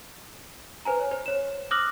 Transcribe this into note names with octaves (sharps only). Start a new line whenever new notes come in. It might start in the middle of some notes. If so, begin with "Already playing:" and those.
B4 C5 G#5 A#5
C#5
C5
C5 C#5 E7
D6 D#6 F6 F#6 A#6 F#7